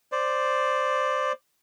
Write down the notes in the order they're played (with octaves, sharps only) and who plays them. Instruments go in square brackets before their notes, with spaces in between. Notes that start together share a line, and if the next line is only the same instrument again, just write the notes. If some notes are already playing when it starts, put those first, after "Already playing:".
[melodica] C5 D5